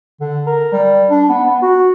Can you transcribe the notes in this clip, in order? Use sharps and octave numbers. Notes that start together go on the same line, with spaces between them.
D3
A#4
G3
D4
B3
B3
F#4